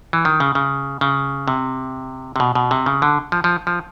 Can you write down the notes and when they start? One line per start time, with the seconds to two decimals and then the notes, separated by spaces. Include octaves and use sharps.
0.13 E3
0.25 D#3
0.40 C#3
0.55 C#3
1.01 C#3
1.48 C3
2.36 C3
2.40 B2
2.55 B2
2.71 C3
2.86 C#3
3.02 D3
3.32 F3
3.44 F3
3.67 F3